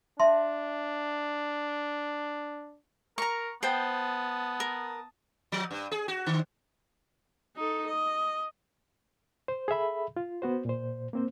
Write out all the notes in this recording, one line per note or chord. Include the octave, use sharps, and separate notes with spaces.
D4 E5 A5 C6
A#4 A#5 C#6
B3 C5 G5 A5 D#6
A#4
F3
G2
G#4
F#4
D3
D#4 A4
D#5
C5
G#4 A4 E5 B5
F4
B3 F#4 C5
A#2 C5
A#3 C4 C5